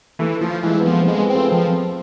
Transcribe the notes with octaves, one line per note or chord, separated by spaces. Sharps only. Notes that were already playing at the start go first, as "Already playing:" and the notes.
E3 A3
F3 A3
E3 G#3
B3
F3 A3
A3 C4
G#3
G#4 B4
C4
F4 A4
F3